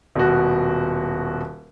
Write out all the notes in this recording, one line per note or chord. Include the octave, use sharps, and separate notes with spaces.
D#1 B2 F#4